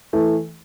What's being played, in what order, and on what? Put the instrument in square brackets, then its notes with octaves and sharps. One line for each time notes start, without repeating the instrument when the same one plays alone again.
[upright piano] E3 A3